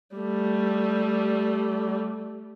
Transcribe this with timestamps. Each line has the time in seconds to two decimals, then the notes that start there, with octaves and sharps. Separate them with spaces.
0.16 G3 A3